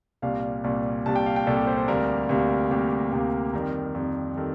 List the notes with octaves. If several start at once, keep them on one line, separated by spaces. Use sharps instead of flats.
C2 A#2 G3 F5
C2 A#2 G3
C2 A#2 G3 A5
G5
F5
G5
C2 A#2 G3 A4
G4
C5
C5
D2 C3 G3 A#3 A#4
D2 C3 G3 A#3
D2 C3 G3 A#3 G4
D2 C3 G3 A#3
F2 D#3 G3 A#4
F2 D#3 G3
D#3 G3 A4